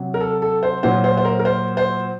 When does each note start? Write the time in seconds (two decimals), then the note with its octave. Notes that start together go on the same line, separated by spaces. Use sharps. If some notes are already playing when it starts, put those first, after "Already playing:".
Already playing: C3 F#3
0.14 A#4
0.21 A4
0.42 A4
0.63 C5
0.83 A#2 F#3 C5
1.04 C5
1.17 C5
1.25 A#4
1.39 A#4
1.45 C5
1.77 C5